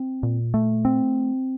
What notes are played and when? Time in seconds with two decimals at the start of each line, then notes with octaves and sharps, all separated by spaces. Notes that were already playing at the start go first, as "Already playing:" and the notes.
Already playing: C4
0.23 A#2
0.54 A3
0.85 C4